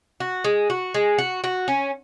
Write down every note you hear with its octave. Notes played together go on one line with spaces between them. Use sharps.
F#4
G#3
F#4
G#3
F#4
F#4
C#4